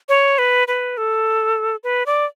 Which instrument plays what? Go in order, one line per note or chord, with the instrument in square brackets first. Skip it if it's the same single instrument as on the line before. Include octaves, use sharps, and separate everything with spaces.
[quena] C#5
B4
B4
A4
B4
D5